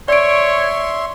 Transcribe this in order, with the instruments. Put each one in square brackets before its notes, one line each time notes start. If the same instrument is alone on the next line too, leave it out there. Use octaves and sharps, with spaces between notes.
[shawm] C#5 [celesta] D5 D7 [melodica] E5 C6 C#6